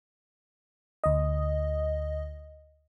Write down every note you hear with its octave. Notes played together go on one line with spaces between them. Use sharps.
D2 D#5